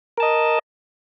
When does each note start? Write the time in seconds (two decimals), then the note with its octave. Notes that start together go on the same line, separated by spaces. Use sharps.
0.18 A#4
0.20 A5
0.23 D#5